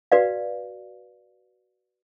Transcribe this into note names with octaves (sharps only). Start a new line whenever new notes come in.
F#4 B4 D5 F5